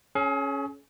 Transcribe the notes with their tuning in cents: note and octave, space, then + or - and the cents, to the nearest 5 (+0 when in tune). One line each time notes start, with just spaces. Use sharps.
C#4 +0 G#4 +40